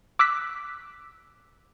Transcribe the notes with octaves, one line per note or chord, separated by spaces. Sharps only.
D6 E6 F#6 B6